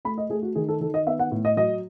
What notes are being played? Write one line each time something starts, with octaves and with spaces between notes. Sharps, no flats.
A3 B5
D#5
A3 G#4
F#4
D#3 G#4
A4
D#3 A4
D#5
B3 E5
F#5
A2
D#5
F#3 D#5